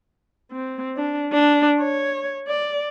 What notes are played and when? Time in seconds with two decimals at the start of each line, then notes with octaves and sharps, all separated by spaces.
0.51 C4
0.97 D4
1.32 D4
1.79 C#5
2.48 D5